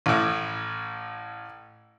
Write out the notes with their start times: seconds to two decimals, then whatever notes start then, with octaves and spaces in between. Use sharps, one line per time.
0.06 A1 A2